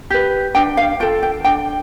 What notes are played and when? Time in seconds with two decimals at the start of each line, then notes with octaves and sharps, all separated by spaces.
0.10 G4 B4
0.55 D4 G5
0.77 F5
1.00 F4 A4 G5
1.23 G5
1.44 D4 G5